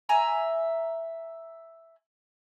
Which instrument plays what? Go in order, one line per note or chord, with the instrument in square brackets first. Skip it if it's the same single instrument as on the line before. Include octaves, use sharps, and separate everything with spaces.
[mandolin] E5 G#5 A#5